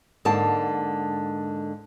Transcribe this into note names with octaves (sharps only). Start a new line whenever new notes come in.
G#2 D3 A#3 A5